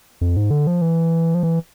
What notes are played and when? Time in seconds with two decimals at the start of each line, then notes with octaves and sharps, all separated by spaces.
0.21 F2
0.37 G#2
0.51 D3
0.67 F3
0.82 E3
1.35 F3
1.43 E3